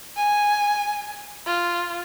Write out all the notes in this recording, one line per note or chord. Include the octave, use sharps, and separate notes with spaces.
G#5
F4